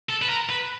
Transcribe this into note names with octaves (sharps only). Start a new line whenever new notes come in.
A4
B4
A#4
B4